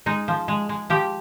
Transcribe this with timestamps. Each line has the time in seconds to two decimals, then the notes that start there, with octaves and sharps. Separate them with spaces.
0.06 G#3 D#4
0.28 F3
0.48 G#3
0.69 G#3
0.90 F3 G4